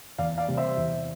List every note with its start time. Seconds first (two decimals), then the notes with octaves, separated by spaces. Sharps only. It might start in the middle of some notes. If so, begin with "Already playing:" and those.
0.18 E2 D5 F5
0.38 D5 F5
0.48 C3 G3
0.57 C5 E5
0.77 E2